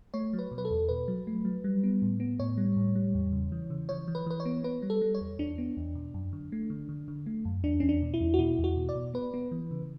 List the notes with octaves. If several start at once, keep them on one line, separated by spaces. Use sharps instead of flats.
A3 C#5
F#3
B4
B2
B4
A4
E2
B2 B4
F#3
A3
F#3
G3
B3
A2
B3
A2 C#5
G3
A2
G3
E2
C#3
E3
C#3
E3 C#5
E3
B4
E3 B4
C#5
B3
B3 B4
G3
A4
G3
C#5
E2
E2 D4
B3
E2
B2
F#2
D3
A3
D3
D3
D3
A3
F#2
E2 D4
E2 C#4
D4
B2
E4
E2
F#4
B2 E4
E2
F#4
B2
D5
B2
B3 B4
B3
E3
C#3